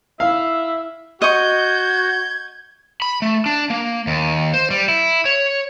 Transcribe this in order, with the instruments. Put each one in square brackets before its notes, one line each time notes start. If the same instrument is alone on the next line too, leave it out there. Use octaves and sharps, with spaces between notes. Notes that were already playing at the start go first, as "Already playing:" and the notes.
[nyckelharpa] E4 [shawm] E5 [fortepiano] F5
[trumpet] F#4 [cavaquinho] D#5 C#6 [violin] G6 [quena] G#6
[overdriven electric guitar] B5
A3
D4
A#3
D#2
C5
G3
E4
C#5